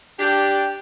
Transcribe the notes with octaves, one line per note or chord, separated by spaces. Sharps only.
D4 G4